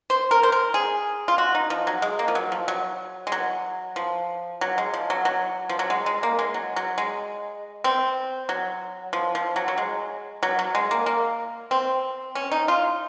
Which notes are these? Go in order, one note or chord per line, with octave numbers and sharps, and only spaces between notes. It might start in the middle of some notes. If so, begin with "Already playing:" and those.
C5
A#4
C5
A#4
G#4
F4
F#4
D#4
F3
F#3
G#3
A#3
F3
F#3
F3
F#3
G#3
F#3
F3
F#3
G#3
F3
F#3
F#3
F3
F#3
G#3
G#3
A#3
G#3
F#3
F#3
G#3
C4
F#3
F3
F3
F#3
F#3
G#3
F#3
F#3
G#3
A#3
A#3
C4
C#4
D#4
F4